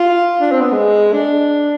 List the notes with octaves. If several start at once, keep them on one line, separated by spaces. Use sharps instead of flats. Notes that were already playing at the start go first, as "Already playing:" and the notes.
Already playing: F4
D4
C4
B3
G#3
D4